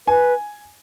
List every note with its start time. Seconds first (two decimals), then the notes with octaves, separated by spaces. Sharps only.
0.07 B4 G#5